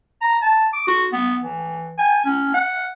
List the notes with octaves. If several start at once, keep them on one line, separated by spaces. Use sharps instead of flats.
A#5
A5
D6
F#4
B3
E3
G#5
C#4
F#5